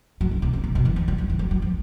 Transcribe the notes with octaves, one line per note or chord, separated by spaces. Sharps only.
F#3
C#3
C3
C#3
B2
B2
E3
F3
G3
F#3
E3
F#3
F#3
F3